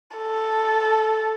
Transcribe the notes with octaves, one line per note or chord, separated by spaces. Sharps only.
A4